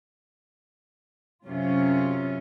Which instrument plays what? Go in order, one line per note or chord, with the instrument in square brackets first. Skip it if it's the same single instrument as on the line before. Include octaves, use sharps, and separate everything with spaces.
[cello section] F#2 C3 C#4 F4